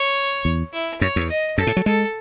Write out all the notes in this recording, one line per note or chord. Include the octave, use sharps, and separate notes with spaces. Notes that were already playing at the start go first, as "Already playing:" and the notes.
Already playing: C#5
E2
E4
F#2 C#5
E2
D#5
F#2 A4
A2
F#3
G#3 A4